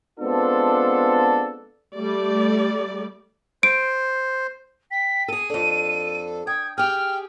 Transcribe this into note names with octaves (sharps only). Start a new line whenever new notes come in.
G#3 B3 C4 D4 F4 A4
G3 A3 D5
C5 D7
G5 B6
G#4 A4 D#7
F2 D4 A4
G5 D#6 G#6
G4 G#4 G5 F6